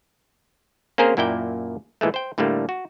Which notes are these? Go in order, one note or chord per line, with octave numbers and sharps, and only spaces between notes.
A#3 C4 C#4 G#4 A#4 C5
F#2 A#2 A#3 E4 D5 G5
A#2 E3 G#3 A3
C5 G5
A2 D3 G3 A3 A#3
F#4